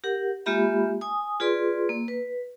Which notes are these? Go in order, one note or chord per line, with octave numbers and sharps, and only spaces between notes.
G4 A#4 F#5
G#3 A#3 F4 G4 E5 B5
G#5 D#6
F4 G#4 B4 D5 C6
A#3
B4